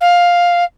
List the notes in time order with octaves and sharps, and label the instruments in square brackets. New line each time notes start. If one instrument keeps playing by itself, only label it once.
[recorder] F5